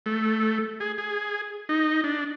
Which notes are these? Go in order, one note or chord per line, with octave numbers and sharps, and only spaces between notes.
A3
G#4
G#4
D#4
D4